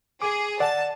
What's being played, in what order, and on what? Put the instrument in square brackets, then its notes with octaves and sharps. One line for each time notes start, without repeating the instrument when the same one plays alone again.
[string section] G#4 [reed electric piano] D6
[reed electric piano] D5 F#5 [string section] A5